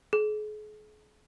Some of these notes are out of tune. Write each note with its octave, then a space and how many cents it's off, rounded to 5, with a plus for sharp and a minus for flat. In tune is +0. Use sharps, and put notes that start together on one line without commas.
G#4 +40